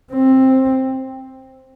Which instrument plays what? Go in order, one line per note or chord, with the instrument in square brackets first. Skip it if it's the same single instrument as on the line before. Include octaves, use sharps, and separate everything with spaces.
[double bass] C4